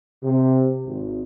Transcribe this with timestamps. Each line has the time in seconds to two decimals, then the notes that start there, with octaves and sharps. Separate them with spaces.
0.24 C3
0.86 G#1